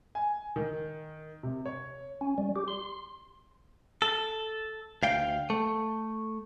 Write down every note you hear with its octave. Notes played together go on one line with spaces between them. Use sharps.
G#5
D#3
C3
C#5
C#4
G3
G4
C6
A4
D2 F5 G5
A3